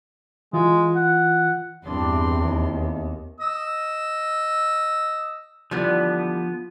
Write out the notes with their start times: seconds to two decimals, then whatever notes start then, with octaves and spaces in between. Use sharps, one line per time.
0.53 E3 G#3 F4
0.96 F#5
1.85 E2 G2 C4 D4 C6
2.38 D#2
3.40 D#5 E6
5.71 D3 E3 F3 G3 B3